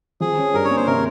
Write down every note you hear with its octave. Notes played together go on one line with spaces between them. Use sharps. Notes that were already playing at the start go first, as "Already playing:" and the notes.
F3 G#4
C#4
G2 A#4
C#5
A#3
C5
C3 A#4